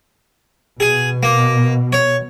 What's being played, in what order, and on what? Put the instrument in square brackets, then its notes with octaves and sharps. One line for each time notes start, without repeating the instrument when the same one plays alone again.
[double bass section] B2 [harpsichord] G#4
[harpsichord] A#3
C#5